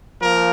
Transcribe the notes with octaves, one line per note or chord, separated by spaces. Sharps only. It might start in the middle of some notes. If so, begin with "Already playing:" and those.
F3 A#3 A#4